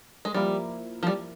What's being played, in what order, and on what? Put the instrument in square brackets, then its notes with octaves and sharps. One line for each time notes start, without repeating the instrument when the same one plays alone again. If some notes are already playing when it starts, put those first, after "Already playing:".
[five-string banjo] G#3
[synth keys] F3 A#3 E4 A#4 [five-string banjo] G3
[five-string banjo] F3
G3